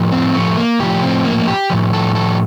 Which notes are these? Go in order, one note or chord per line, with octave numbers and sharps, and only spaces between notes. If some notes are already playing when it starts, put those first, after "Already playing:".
Already playing: A2 F3
C4
A3
A#3
A2 F3 G4
C4
A#3
G4
A2 F3
A4
A4